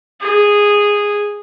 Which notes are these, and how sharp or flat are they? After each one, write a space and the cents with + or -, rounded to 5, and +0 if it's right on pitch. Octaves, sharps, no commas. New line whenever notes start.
G#4 -10